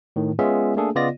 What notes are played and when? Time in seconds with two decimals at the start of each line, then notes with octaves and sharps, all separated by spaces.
0.16 A2 D#3
0.39 G#3 B3 C#4 F4 G#4 E5
0.77 A3 A#3 D4 G#4 A4
0.95 C#3 B3 F4 D5 D#5 A#6